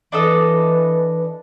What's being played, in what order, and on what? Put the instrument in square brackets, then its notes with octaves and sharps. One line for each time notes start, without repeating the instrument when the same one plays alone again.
[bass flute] E3 [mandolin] D4 A4 D#5